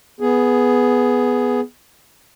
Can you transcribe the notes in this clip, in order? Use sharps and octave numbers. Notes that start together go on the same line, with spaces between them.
B3 G#4